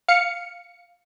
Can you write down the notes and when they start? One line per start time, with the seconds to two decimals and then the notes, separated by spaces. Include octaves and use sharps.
0.08 F5 C#7